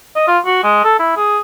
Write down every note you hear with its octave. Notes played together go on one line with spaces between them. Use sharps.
D#5
F4
F#4
G#3
A4
E4
G#4